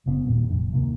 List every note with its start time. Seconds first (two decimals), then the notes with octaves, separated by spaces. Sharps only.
0.06 F#1 C#3 B3 C4
0.25 D#1 G2 A#2 D#3
0.49 F1 A#1 F2
0.72 D2 C3 D#3 A#3